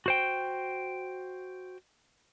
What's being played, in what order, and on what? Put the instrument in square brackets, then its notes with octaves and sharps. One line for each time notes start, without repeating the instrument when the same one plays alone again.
[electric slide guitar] F#4 C5 G5